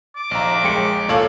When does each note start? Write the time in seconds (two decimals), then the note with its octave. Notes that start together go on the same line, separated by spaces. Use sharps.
0.16 D6
0.31 A#1 D#5 F5 A#5
0.64 G#3 G5 C#7
1.09 A#2 A4 C#5 F5 A5 F#7